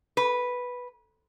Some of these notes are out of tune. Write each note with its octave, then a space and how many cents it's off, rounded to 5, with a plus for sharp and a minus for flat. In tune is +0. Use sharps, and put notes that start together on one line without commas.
B4 -5